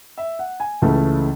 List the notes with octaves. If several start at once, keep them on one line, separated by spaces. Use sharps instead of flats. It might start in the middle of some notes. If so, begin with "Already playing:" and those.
E5
F#5
G#5
C#2 C#3 E3 A3 A5